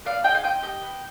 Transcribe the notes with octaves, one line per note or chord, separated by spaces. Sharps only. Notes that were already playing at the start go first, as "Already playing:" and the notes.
B3 D5 F5
F4 G#4 D#5 G5
F5
C4 D#5 G5
G4 D#5 G5
B3